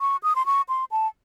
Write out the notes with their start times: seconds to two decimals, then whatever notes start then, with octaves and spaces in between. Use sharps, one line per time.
0.01 C#6
0.23 D#6
0.36 C6
0.46 C#6
0.69 C6
0.91 A5